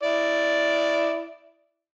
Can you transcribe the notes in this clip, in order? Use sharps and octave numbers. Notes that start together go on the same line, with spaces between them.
E4 D5